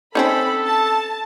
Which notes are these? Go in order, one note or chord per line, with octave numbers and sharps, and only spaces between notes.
C4 C#4 D#4 A4 B5
A5